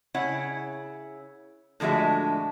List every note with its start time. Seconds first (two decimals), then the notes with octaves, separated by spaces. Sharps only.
0.14 C#3 E4 C#5 F#5
1.80 A2 D3 F3 G#3 F#4 E5